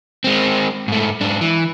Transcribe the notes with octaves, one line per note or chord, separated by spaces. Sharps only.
G#3 C4
G#2 A3
G#2 D4
E3